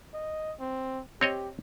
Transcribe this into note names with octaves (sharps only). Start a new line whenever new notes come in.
D#5
C4
C4 G4 C#5 D#5